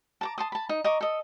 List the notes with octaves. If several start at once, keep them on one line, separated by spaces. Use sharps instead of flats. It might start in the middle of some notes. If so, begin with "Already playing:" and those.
A5 A#5 D6
A5 C6 D#6
A5 B5
D#4
D#5 A#5 C#6 D6
A4 D#5